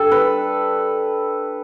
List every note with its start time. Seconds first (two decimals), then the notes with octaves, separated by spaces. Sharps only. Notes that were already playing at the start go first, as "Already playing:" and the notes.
Already playing: G3 D4 A4
0.11 B4